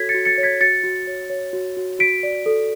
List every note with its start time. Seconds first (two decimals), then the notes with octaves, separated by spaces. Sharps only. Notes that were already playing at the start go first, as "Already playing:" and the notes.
Already playing: F#4 A4 C#5 G#6 B6
0.09 A6 C#7
0.14 F#4
0.25 A6 C#7
0.38 C#5
0.43 G#6 B6
0.61 F#4 A6 C#7
0.83 F#4
1.07 C#5
1.30 C#5
1.53 F#4
1.77 F#4
1.99 F#4 B6 D7
2.23 D5
2.46 A4